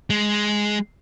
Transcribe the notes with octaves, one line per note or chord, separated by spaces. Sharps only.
G#3